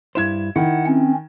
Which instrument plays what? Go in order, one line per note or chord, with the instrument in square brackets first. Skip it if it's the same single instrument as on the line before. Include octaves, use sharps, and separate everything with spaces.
[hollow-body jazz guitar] G2 E4 C5 [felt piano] G#6 E7
[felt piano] D#3 [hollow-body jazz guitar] E4 [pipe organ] F#5
[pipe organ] C4 C#4